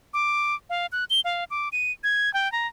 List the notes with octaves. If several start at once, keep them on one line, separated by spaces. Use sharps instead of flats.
D6
F5
F#6
G7
F5
D6
D#7
G#6
G5
A#5